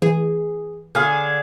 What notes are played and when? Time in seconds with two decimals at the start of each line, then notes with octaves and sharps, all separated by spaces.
0.02 E3 G#4
0.95 D3 G#4 F5 G#5